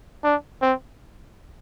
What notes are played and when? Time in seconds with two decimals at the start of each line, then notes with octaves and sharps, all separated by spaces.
0.24 D4
0.62 C4